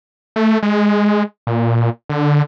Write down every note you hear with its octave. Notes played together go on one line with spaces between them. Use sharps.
A3
G#3
A#2
D3